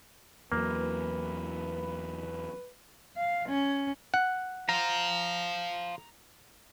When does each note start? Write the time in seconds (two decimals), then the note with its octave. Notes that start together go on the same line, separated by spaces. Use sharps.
0.52 E2 F#3 A#3 B4
3.17 F5
3.49 C#4
4.14 F#5
4.69 C5 F5 A#5